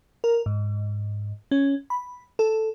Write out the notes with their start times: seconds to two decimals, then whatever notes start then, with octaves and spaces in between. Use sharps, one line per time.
0.24 A#4
0.46 G#2
1.51 C#4
1.90 B5
2.39 A4